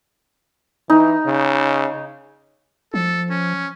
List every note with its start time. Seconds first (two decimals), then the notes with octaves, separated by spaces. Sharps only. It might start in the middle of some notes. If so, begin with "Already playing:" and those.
0.90 E3 D#4
1.26 C#3
2.94 F3 A4
3.30 C#4